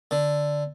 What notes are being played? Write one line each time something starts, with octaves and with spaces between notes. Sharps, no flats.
D3